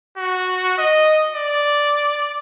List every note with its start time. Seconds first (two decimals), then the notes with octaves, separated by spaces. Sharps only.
0.18 F#4
0.78 D#5
1.34 D5